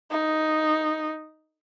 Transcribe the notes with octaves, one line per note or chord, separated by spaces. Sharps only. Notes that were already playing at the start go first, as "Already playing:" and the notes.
D#4